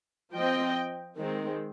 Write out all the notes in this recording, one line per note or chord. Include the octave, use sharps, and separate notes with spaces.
F3 C4 D#5 G5
D#3 G#3 C4